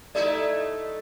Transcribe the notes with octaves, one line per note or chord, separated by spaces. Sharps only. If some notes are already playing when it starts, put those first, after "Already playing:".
A3 D#4 E4 G4 D5